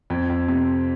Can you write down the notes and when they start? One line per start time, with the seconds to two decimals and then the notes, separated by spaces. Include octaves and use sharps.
0.10 F2
0.30 F2
0.49 C3